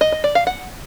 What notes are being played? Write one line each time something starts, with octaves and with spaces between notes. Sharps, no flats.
D#5
D#5
D5
F5
F#5